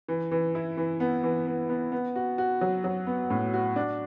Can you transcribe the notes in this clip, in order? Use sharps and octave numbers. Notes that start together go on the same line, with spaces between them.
E3
E3
E4
E3
B3
E3
B3
B3
B3
F#4
F#4
F#3
F#3
B3
A2
F#4
D4